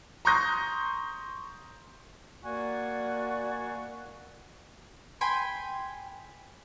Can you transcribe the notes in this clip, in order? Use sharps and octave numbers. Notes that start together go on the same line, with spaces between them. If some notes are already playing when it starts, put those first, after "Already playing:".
A#5 C6 C#6 D#6 G6 A#6
A#3 F#4 D5 G#5
G5 G#5 B5 C6